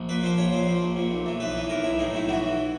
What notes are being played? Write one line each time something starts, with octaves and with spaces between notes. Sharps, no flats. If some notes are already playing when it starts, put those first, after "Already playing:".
Already playing: A#1
A#2 B4
F3 C5
A#1 C#5
A#2 C5
F3
A#1
A#2
B1
E3
B1 B4
E3
B1 A#4
B1 E4
A2 D#4
B1 E4
E3 F#4
E3